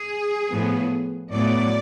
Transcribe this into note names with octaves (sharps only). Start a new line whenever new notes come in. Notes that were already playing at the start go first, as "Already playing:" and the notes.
Already playing: G#4
A2 F3 B3
A2 F#3 B3 D5